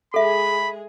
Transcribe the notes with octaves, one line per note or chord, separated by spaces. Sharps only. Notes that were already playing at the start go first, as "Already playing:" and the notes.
G#3 G#4 A4 E5 B5